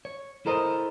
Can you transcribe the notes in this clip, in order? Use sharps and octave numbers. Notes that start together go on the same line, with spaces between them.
C#5
E4 A4 A#4 C5 D#5